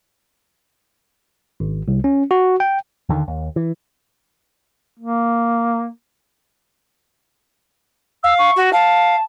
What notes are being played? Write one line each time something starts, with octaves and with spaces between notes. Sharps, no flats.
G#1
C2
C#4
F#4
G5
D#2 D3 D#3
D#2
E3
A#3
F5 E6
C#6
F#4
F5 A5